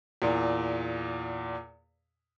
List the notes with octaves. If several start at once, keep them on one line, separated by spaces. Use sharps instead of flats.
E2 A#2